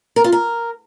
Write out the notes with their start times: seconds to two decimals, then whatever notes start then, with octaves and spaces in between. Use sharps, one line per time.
0.16 A#4
0.24 F4
0.32 A#4